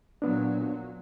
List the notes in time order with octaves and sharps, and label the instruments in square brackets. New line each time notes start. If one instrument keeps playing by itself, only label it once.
[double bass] A#2 F#3 [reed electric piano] B3 D4